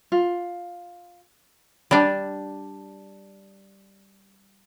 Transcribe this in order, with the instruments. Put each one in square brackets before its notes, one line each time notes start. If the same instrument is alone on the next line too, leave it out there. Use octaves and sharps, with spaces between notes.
[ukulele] F4
[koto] G3 D4